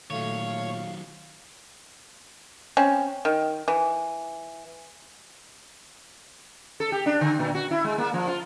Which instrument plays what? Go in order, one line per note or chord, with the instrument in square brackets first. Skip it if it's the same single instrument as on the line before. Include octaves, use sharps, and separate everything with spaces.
[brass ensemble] A#2 A3 [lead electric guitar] D#3 F#3 [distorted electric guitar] C#5 [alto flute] F5
[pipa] C4 C#4
D#3
E3
[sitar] A4
G4
D4
D3
A#2
F#4
E4
G#3
A#3
F3
F4